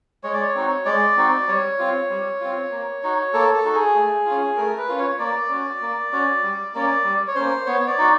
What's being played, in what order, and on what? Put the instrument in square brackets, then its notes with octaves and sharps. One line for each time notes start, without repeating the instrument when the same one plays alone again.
[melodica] G#3 C#5
D5
C#5
C4 D#4 F#4
G#3 D5
C4 D#4 F#4
G3 C#5
C4 F4
G3
C4 F4
A#3
D#4 F#4
A#3 A4
A4
D#4 F#4
G#4
A3
F4
C#4
A3 A#4
B4
C#4 F4
C#5
C#5
A#3 D5
C#4 F#4
A#3
C#4 F#4
G3
A#3 C#4
G3
C#5
A#3 C#4 C5
B3 C#5
C#5
D5
D#4 F#4